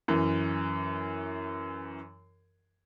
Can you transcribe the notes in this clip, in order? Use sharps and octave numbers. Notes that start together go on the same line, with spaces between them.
F#2 E3